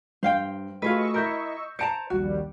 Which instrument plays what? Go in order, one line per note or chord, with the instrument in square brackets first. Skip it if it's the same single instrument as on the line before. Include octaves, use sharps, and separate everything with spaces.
[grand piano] G2 [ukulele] C5 F5 G5
[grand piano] A3 F#4 [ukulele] F4 G#4 B4 [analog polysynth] D#5 C#6 E6
[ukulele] E4 A#4 [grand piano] B5 G6
[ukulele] C5 A5 A#5 [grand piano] C#7 D7
[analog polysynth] A#1 D#2 G3 [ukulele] F#4